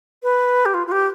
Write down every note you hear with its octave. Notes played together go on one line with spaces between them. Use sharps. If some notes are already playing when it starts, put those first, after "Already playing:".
B4
G4
F4
F4
G4